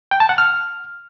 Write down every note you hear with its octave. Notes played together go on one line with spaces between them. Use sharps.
G5
A5
F#5
F6